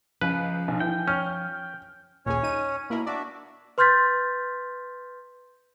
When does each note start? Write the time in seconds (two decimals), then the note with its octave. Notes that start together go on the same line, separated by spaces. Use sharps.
0.21 C#2 F3 B4
0.68 B1
0.80 E3 G5
1.08 C#4 F6
2.26 A#1 D#2 C#4 G#4 C#5
2.43 D#4 D#7
2.90 B2 A#3 E4 A#4 B5
3.06 D4 F#4 D5 E5
3.78 B4 C6 F6 G6 A6 B6